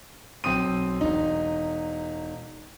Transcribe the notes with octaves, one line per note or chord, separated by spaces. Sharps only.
B1 C4 D#6 D#7
E1 D#4